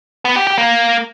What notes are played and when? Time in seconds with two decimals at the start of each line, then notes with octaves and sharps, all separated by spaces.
0.25 B3
0.36 G4
0.47 G4
0.58 A#3